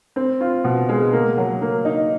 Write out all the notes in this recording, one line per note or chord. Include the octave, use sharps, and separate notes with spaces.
C4
F4
B2
G#3
A#3
F#3
A#3
D#4